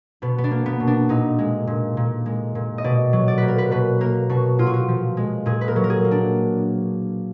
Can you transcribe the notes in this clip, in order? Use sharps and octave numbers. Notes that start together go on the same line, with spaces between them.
B2 B3
B3
D4
A#3
B3
B2
D4
A#2 D#4
G#3
A#2
A#2
G#3
A#2
D#5
B2 D5
F#3
D5
A#3 B4
A#4
B4
B2 B4
A#3 A#4
B2 F#4
A#2 F4
F#4
F4
F3
G#3
A#2 G#4
B4
A#4
F#3
A#4
G#4
A#3
D4